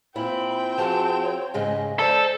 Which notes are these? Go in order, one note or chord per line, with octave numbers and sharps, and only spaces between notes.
A#2 C4 E4 G5 B5
F3 F#4 G#4 A5
C#5
G#2 C#3 G#3 D#5
A4 C5 D5